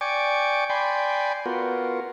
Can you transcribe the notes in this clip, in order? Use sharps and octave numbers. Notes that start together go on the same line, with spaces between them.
D5 G5 G#5 C#6 D6
D5 G5 G#5 B5 C6
B3 F4 F#4 A#4